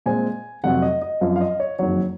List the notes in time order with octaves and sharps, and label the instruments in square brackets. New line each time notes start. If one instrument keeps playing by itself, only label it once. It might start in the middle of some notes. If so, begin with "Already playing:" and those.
[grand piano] A#2 G#3 C4 G#5
F1 F2 C3 F#3 F#5
D#5
D#5
F#2 F3 C4 F4 F5
F5
D#5
C#5
F#1 F2 D#3 F#3 C#5